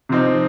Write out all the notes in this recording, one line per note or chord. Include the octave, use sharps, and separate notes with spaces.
C3 F3 C4 D#4